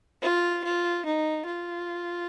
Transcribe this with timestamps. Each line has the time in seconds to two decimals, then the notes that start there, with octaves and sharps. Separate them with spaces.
0.22 F4
0.64 F4
1.05 D#4
1.46 F4